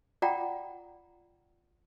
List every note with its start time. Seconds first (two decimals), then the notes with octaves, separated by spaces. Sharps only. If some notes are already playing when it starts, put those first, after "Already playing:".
0.22 F4 D5 F#5 G5 A#5